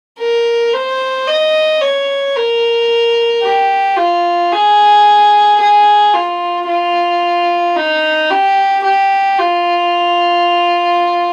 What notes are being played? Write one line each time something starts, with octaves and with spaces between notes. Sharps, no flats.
A#4
C5
D#5
C#5
A#4
G4
F4
G#4
G#4
F4
F4
D#4
G4
G4
F4